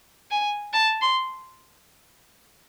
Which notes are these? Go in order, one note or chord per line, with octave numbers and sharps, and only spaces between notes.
G#5
A5
C6